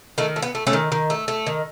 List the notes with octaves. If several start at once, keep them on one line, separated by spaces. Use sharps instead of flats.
D#3 A3
A3
B3
A3
A3 C#4
D#3
D#3
A3
A3
D#3